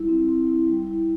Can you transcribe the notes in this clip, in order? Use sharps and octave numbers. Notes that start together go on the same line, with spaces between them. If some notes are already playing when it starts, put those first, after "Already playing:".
Already playing: G3 E4
C4
C4
E4
G3
E4